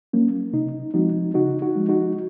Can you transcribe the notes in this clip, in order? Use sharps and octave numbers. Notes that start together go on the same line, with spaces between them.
F#3 A#3 C#4
C3 D#4
F3 G#3 C4 D#4 F#4
C#3 D#4 F#4
D#4 F#4
F3 G#3
D#4 F#4